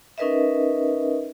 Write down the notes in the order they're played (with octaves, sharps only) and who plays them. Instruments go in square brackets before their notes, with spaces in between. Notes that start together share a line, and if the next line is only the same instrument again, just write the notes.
[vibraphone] C#4 D#4 A#4 B4 D#5 E5